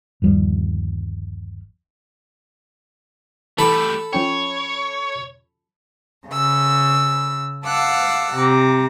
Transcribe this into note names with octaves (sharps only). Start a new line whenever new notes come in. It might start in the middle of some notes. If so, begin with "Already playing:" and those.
G1 D#2 F3 G3
E3 A3 G4 A4 A5 B5
F3 C#4 C#5 G5
C#3 E6
F5 F#5 A5 D6 E6 F#6
C3 A#5 D6